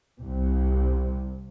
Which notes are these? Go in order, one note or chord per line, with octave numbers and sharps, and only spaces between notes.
C2 C3